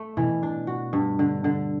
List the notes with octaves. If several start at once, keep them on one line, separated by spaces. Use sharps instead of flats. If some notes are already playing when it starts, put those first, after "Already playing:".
Already playing: A3
B2 E3
D4
F#4
G2
D3
D3